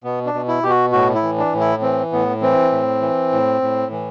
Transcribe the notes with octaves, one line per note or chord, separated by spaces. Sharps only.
B2 B3
D4
B2
E4
B2 G4
F#4
A2 F#4
E4
E3
D4
A2
E4
E3 C4
A2 B3
E3 C4
A2
E3
A2
A2
E3